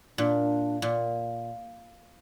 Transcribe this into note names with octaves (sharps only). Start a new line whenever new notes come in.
A#2 D4
A#2